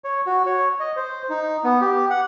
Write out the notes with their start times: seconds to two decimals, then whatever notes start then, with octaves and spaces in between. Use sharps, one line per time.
0.04 C#5
0.26 F#4
0.46 C#5
0.80 D#5
0.96 C5
1.30 D#4
1.64 B3
1.81 G4
2.10 F#5